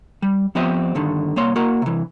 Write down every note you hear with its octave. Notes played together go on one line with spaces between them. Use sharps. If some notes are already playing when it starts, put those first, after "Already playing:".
G3
F3 B3 C4 G4 D#5 E5
G2 D3 D#3
C2 A#3 C#5 C6
A#3 F#4 A#4 F#5
C3 E3